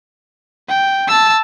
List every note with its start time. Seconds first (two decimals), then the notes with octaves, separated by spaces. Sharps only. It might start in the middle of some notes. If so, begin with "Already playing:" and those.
0.69 G5
1.08 A5 E6